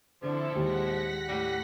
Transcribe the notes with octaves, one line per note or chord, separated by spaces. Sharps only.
D3 F3 C4 E4 A4
D#2 A#2 G#3 F#5 A#6 B6
A2 G3